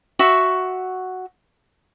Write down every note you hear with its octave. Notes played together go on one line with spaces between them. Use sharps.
F#4 E5 C#6